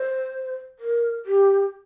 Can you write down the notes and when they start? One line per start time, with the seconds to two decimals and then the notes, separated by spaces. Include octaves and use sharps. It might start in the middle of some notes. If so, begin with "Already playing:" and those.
Already playing: C5
0.79 A#4
1.26 G4